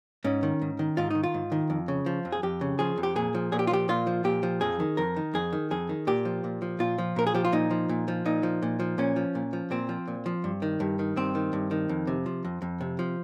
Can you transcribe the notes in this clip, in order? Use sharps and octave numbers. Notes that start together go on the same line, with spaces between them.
G#2 C#4
D#3
G#2
D#3
G#2 F4
D#3 D#4
F4
G#2
D#3
F2
C#3
F3
F2
G#4
F2 G4
C#3
F3 G#4
F2
G4
A#2 G#4
F3
A#2 G#4
G4
F4
F3 G4
A#2 F4
F3
A#2 G4
F3
F2 G#4
D#3
F2 A#4
D#3
F2 G#4
D#3
F2 G#4
D#3
A#2 G4
F3
A#2
F3
A#2 F4
F3
A#2 A#4
G#4
F3 G4
F4
A#2 D#4
F3
A#2
F3
A#2 D#4
F3
A#2
F3
A#2 C#4
F3
A#2
F3
A#2 C4
F3
A#2
F3
G2
D#3
G2
D#3
G2 C4
D#3
G2
D#3
F2
C3
F3
F2
F2
C3
F3